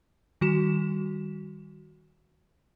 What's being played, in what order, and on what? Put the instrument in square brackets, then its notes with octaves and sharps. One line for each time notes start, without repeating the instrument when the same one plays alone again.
[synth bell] D#3 G3 F#4 E7